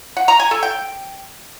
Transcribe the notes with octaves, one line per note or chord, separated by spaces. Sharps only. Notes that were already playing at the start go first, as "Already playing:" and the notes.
F#5
A#5
G#5
A4
G5